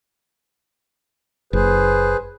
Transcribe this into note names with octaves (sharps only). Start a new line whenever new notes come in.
F#1 G#4 B4 C5